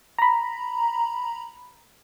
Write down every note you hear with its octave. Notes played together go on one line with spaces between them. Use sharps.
A#5 B5